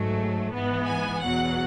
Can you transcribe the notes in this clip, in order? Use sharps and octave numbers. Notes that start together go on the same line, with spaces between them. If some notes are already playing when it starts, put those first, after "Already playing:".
Already playing: G#2 F#3 A3
G#2 E3 B3
G#5
E2 B2 F#3 F#5